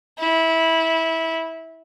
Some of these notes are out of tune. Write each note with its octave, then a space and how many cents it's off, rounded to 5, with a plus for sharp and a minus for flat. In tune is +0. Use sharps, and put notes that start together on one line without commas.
E4 -20